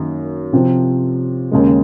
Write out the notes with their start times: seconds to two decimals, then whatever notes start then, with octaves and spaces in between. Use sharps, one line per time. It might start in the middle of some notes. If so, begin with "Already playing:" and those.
Already playing: F#2 D#3 A#3
0.53 C3 F3 C4
1.52 D#2 C#3 G#3